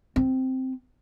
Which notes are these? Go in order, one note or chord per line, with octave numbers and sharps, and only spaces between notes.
C4